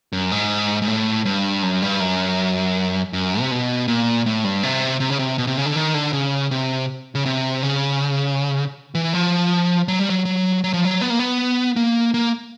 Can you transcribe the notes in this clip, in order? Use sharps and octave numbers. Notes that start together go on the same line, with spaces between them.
F#2
G#2
G#2
A2
G2
F#2
G2
F#2
F#2
C3
B2
A#2
A2
G2
C3
C3
C#3
C3
B2
C3
C#3
D3
D#3
D3
C#3
C3
C#3
C3
C#3
E3
F3
F#3
G3
F#3
F#3
F#3
F3
F#3
B3
A#3
B3
A#3
A#3